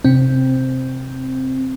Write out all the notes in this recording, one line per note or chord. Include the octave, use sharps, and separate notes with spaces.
C3 C4